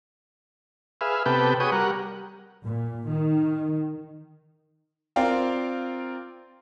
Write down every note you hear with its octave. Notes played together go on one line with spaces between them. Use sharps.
G#4 B4 E5 F5
C3 B3 G4 A4 B4 G5
F#4 G#4 B4 C#5 G5 D#6
G3 A#4 F#5
A#2
D#3
C4 F4 A#4 D5 F5 G5